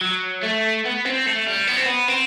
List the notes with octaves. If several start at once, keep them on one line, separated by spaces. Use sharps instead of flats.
F#3
A3
B3
C4
A3
G3
B3
C4
B3
C4